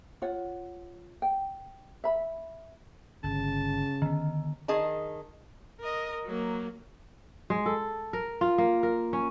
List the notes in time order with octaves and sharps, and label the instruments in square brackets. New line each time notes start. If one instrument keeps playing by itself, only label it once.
[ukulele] F4 C#5 F#5
G5
E5 B5
[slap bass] G1 [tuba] C#3 [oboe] A5
[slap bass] D3 B3 [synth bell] D#3
[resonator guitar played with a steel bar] D#3 G#4 D#5 A5
[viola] A#4 D#5
F#3 A#3
[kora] G#3
A4
A#4
F4
A#3
A#4
C#4